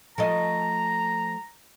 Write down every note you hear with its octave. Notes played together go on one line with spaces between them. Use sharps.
F3 A3 D#5 A#5